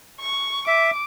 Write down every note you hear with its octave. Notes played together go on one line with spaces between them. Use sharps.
C#6
E5 D6